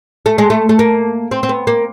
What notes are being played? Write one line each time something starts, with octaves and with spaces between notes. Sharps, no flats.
A3
G#3
A3
A3
A#3
C4
C4
B3
A#3